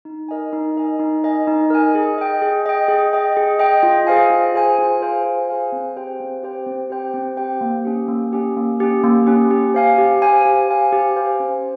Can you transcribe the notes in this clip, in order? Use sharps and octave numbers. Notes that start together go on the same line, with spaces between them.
D#4
A#4 D#5 G#5
D#4
A#4 D#5 G#5
D#4
A#4 D#5 G#5
D#4
A#4 D#5 G#5
G#4
D#5 G5
G#4
D#5 G5
G#4
D#5 G5
G#4
D#5 G5
F4
G#4 C5 F5 G#5
F4
G#4 C5 F5 G#5
F4
G#4 C5 F5 G#5
F4
G#4 C5 F5 G#5
C4
G4 C5 G5
C4
G4 C5 G5
C4
G4 C5 G5
C4
G4 C5 G5
A#3
C#4 G4
A#3
C#4 G4
A#3
C#4 G4
A#3
C#4 G4
G4
C5 F5 G#5
G4
C5 F5 G#5
G4
C5 F5 G#5
G4
C5 F5 G#5
C#4